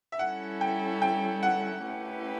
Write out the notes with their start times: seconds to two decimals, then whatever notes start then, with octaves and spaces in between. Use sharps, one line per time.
0.12 E5
0.19 G3 C#4 E4 A4 F#5
0.61 G5
1.02 G5
1.43 F#5
1.84 A3 C#4 E4 G4 B4